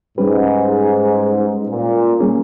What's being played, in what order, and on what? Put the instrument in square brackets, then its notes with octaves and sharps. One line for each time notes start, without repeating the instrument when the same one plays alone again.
[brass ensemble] G#2 [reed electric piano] G3 C#4 G4 B4
[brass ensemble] A#2
[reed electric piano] G3 A#3 C#4 G#4